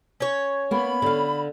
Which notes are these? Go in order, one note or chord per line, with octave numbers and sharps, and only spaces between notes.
C#4 C#5
A#3 B3 B5
D3 F5